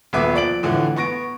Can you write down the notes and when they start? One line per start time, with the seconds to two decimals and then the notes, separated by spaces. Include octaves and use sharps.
0.13 D#1 B2 B3 B4 E5 D6
0.34 F3 D5 D7 F#7
0.63 A2 D3 E3 A3
0.96 B3 C#6 A#6 D7